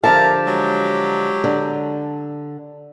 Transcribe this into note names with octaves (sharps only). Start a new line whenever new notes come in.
D3 F3 G4 A#4 E5 F5 A5
F#3 G#3
D3